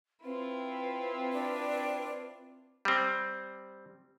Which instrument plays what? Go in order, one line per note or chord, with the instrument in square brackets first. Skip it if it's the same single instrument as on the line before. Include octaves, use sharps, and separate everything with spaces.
[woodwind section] C4 [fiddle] E4 F4 [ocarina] B4
[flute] D4
[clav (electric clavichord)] G3 C4